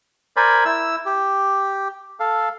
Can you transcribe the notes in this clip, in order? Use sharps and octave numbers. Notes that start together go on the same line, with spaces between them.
A#4 C5 D5 G#5 B5
E4 E6
G4
A4 F5